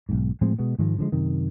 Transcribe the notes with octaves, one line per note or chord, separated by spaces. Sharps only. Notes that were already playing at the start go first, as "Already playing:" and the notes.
B1 G#2
A2 F3 G#3 C4
B2 G#3 B3
G#2 D#3 F3 G#3
D3 F3 G#3
F#2 C3 D#3